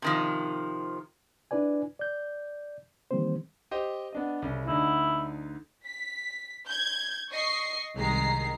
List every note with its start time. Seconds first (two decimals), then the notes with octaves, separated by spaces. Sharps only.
0.02 C3 D#3 F3
1.51 D4 E4 B4 D5 G#5
1.99 D5 G6
3.11 D#3 E3 G3 A#3 C4 C5
3.71 G4 C5 D#5
4.13 B3 D4 D#5
4.42 C2 C#3
4.67 D2 D3 D#4 E4
5.85 B6
6.67 G6 G#6
7.31 D#5 C#6 C7
7.97 C2 D#3 G#3 A#5 C7